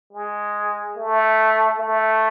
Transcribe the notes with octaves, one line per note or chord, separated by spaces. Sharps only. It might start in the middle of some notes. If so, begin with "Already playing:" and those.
G#3
A3
A3